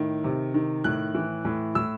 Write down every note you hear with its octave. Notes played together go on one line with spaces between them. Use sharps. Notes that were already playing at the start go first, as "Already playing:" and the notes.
Already playing: A2 D#3
C3
D#3
A2 F#6
E3
A2
A2 E6